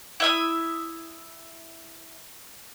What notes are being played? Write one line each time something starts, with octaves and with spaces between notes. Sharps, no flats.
E4 E5 D#6